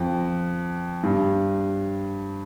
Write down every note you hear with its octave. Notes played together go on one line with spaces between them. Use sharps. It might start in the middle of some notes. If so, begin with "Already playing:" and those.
Already playing: F2
G2